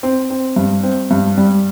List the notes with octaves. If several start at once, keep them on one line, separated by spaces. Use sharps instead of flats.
C4
C4
G2
C4
G2
G3